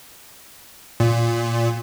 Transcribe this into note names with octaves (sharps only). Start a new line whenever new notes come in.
A#2